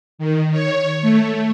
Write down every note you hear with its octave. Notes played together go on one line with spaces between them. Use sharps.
D#3
C#5
A3